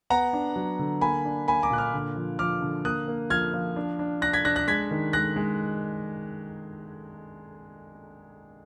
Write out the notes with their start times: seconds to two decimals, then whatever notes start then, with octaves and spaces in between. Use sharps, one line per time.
0.10 B3 F#5 A#5
0.33 D4
0.56 F#3
0.79 D3
1.01 A#3 G#5 B5
1.25 D4
1.47 A#3 G#5 B5
1.63 A#5 D6
1.70 A#2 F#6
1.78 D6 F6
1.93 D3
2.16 F3
2.39 F3 D6 F6
2.62 D3
2.85 A#3 D#6 F#6
3.08 A#3
3.30 F3 F6 G#6
3.54 F3
3.76 D4
3.99 D4
4.21 D4 F#6 A#6
4.33 G#6 B6
4.45 D4 F#6 A#6
4.56 F#6 A#6
4.68 G#3 G#6 B6
4.91 D#3
5.13 G#3 F#6 A#6
5.36 G#3